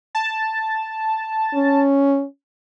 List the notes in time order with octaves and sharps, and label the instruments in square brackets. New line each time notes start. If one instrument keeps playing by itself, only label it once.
[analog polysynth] A5
[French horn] C#4